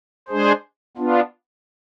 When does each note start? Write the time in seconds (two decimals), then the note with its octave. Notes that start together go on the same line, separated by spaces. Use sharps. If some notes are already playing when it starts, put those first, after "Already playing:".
0.29 G#3 D4 G#4 C5
0.97 B3 D4 F4